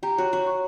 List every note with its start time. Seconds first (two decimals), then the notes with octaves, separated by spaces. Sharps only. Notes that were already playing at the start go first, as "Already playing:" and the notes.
0.03 G4 A#5
0.18 F#4 C#5
0.32 F#4 C#5
0.47 C#6